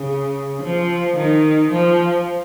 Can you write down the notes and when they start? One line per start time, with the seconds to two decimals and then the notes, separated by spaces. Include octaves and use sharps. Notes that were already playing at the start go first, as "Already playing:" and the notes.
Already playing: C#3
0.63 F3
1.17 D#3
1.72 F3